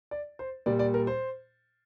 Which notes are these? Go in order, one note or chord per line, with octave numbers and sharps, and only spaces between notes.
D5
C5
A#2 G3 D5
D5
A#4
C5